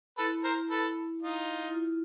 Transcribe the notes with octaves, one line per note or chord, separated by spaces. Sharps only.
E4 A4 B4
A#4 C5
A4 B4
D#4 F4
E4
F4